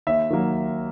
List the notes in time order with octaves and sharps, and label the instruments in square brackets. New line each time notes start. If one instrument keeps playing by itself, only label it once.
[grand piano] D#2 E5
D#3 F#3 A#3